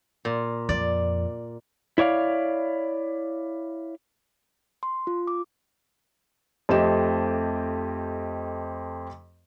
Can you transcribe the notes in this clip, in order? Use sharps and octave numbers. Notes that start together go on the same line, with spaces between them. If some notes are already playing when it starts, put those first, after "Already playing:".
A#2
F2 D5
E4 C#5 D5 F5
C6
F4
D6
F2 A3 C4 G4 D#5 E7